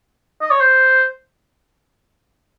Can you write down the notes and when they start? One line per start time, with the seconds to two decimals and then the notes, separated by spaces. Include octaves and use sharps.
0.41 D#5
0.51 C#5
0.60 C5